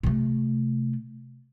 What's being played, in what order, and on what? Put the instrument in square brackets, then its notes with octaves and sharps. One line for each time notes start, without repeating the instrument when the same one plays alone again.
[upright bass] C3 A3